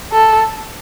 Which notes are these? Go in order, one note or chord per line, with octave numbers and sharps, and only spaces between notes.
A4